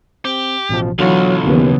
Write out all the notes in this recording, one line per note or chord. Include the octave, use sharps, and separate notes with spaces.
C4 G4
A1 B2 F3
B1 D3 E3 F#3 F4 C#6
D#2 C#3 E3 B3